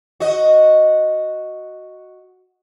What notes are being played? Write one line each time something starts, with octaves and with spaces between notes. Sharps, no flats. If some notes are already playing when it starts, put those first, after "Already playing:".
F#4 D#5